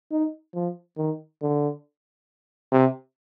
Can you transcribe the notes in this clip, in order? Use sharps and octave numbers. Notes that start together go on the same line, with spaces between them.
D#4
F3
D#3
D3
C3